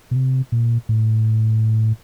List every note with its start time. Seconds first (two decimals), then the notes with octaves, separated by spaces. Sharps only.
0.11 B2
0.16 C3
0.52 A#2
0.89 A2